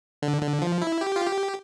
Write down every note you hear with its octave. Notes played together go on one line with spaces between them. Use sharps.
D3
D3
F3
E4
G4
F4
G4